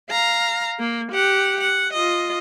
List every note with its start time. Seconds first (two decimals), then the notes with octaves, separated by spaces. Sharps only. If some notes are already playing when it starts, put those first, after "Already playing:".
0.11 F5 A#5
0.79 A#3
1.12 G4 F#5
1.60 F#5
1.93 F4 D#5